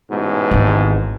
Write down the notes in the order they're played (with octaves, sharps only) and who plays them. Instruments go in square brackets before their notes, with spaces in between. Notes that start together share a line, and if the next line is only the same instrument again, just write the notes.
[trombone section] A1 G#2 B2
[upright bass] G#1 D#3